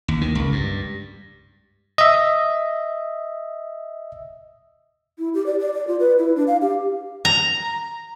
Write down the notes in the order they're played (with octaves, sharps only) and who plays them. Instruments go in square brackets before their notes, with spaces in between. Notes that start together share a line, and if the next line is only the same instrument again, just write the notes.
[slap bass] D#2
D#3
C#2
G2
[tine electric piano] D#5 E5
[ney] E4
G4
D5
D5
D5
F4
B4
E4
D4
F5
G4
[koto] A#5